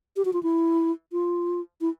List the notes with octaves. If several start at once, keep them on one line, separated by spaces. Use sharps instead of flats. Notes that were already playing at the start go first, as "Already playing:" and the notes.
G4
F#4
F4
E4
F4
E4